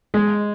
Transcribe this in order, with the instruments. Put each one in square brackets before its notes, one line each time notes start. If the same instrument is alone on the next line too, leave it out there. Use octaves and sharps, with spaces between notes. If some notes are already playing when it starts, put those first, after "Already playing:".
[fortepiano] G#3